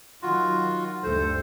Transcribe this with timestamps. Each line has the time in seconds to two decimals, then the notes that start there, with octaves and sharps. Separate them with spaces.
0.22 D#3 F#3 F4 F#4
1.03 D2 G2 A4 C5